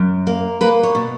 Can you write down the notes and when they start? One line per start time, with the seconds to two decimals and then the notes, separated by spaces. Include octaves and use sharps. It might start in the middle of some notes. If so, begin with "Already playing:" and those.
Already playing: F#2
0.27 A#3
0.61 A#3 B4
0.83 C#5
0.95 B2